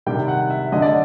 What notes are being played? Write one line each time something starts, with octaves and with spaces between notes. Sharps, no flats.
C3 D#3 G3 G5
F#5
E5
D3 F#3 D#5
D5